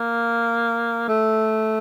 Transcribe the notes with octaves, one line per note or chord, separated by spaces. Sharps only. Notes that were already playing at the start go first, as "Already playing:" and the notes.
Already playing: A#3
A3